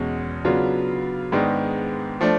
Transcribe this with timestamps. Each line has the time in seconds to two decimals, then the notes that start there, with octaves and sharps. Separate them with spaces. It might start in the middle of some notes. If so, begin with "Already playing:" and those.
Already playing: E2 B2 G#3 C#4
0.45 C#3 F#3 B3 D4 F4
1.32 G#2 D#3 G#3 B3 D4
2.21 F3 A3 D4